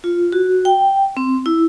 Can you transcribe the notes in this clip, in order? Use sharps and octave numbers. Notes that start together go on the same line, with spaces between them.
F4
F#4
G5
C4
E4